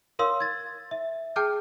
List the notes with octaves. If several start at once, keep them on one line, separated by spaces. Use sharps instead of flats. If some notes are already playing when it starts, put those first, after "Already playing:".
A#4 C#5 F5 C6 D#6 E6
G#6 A6
E5
G#4 G5 A5 D6 F6 G6